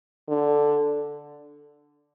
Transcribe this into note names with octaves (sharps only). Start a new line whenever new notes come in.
D3